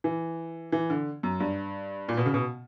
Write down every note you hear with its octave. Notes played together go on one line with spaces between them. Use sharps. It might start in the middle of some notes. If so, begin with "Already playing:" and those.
E3
E3
D3
F#2
G2
A#2
B2
C#3
B2